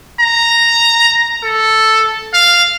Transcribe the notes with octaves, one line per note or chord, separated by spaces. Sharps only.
A#5
A4
F5